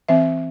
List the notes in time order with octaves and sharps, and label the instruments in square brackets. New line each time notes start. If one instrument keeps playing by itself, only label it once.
[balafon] E3 C4 E5